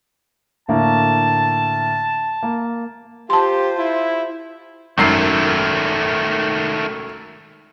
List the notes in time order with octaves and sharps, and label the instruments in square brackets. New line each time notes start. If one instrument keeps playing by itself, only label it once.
[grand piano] A2 D3 A#3 [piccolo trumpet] A5
[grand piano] A#3
[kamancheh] F4 C5 [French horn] G4 [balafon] A5 C6
[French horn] E4
[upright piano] G#1 F#2 C7 [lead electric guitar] D#3 A3